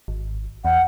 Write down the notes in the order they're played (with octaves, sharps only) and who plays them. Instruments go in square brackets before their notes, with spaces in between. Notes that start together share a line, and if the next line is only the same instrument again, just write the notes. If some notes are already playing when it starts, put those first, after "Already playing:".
[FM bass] G#1
[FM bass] E2 [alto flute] F#5